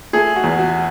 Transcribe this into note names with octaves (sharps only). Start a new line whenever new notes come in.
A3 G#4
F#4
E2
F#4